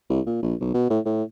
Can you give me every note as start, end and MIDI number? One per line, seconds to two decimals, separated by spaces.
0.10 0.21 36
0.26 0.41 46
0.43 0.55 34
0.61 0.71 35
0.74 0.88 47
0.90 0.99 45
1.05 1.23 45